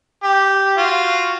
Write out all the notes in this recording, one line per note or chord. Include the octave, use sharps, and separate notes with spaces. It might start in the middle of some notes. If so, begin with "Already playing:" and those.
G4
F4 F#4